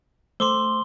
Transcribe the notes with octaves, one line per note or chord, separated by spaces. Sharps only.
A3 C5 C6 D6 E6 G7